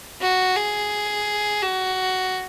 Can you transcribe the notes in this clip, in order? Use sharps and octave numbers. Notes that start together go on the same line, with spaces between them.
F#4
G#4
F#4